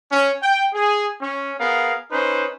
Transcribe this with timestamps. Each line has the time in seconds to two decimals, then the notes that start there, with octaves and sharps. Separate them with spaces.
0.11 C#4
0.43 G5
0.74 G#4
1.21 C#4
1.59 B3 G#4 A#4 F5
2.12 C#4 D#4 B4 C5